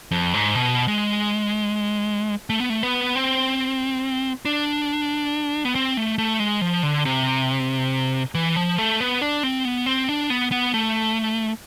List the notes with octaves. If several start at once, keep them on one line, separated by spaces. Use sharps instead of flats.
F2
G#2
B2
G#3
A3
B3
A3
B3
C4
D4
B3
C4
A3
A3
G#3
F3
D3
C3
E3
F3
A3
B3
D4
C4
B3
C4
D4
B3
B3
A3